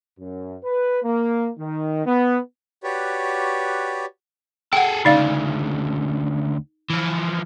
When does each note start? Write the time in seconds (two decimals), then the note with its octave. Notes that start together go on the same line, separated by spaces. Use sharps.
0.18 F#2
0.64 B4
1.03 A#3
1.57 D#3
2.06 B3
2.84 F#4 G4 B4 C#5 D5
4.73 G#4 A4 F#5 G5
5.05 D2 C#3 D#4 D5 F5
6.90 E3 F3